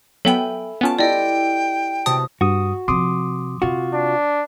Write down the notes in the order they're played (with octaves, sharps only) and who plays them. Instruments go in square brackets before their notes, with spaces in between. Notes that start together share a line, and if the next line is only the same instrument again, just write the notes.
[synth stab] F#3 B3 G5 [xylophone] A4 [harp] E5 G#5 B5
[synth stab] B3 C#4 A5 [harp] F4 G5
[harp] E4 G4 A4 [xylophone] D5 D#5 [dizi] G5
[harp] C3 B3 F#4 [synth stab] A5 [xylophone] D#6
[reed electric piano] G2 D#6 [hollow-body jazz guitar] F#4
[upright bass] C3 F3 [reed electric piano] C6 D6 D#6
[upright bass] C3 [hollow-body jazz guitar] F4 F#4
[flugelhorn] D4